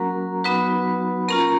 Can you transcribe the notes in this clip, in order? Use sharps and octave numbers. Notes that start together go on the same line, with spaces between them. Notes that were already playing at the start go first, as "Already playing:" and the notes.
Already playing: F#3 A#3 C#4 F#4 A#4 A#5
F#3 B3 D#4 F#4 B4 B5
A#3 C#4 F4 A#4 A#5